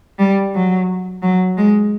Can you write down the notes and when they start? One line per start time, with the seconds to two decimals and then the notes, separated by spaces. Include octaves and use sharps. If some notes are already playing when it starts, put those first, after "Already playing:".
0.19 G3
0.55 F#3
1.23 F#3
1.57 G#3